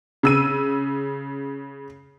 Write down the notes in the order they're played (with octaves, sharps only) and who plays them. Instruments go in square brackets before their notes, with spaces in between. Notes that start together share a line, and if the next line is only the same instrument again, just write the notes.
[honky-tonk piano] C#3 E6 D#7